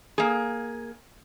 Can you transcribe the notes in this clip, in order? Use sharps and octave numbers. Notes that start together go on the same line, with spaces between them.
A#3 G#4